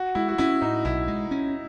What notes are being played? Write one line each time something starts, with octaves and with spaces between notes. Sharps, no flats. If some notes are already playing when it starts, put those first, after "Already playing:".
Already playing: F#4
G#3 E4
F#4
C#4 E4
A2 D#4
B1 E4
G#3
C#4